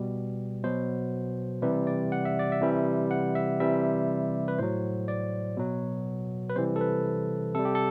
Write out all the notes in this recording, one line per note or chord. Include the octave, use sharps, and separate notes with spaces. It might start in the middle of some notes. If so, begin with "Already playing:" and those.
Already playing: B2 G3
B2 F#3 C5
C3 E3 G3 B4
D5
F#5
E5
D5
E5
C3 E3 G3
F#5
E5
C3 E3 G3 E5
B4
A2 F#3 C5
D5
B2 F#3
B4
C3 E3 G3 C5
A4
B4
C3 G3 A4
G4
A4